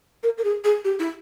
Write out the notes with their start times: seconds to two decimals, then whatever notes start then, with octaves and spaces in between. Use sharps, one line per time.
0.23 A#4
0.38 A#4
0.44 G#4
0.64 G#4
0.84 G4
0.99 E4